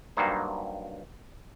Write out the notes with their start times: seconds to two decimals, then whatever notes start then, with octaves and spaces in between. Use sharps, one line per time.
0.17 G2 F#3 G3 A#3 D#4 C5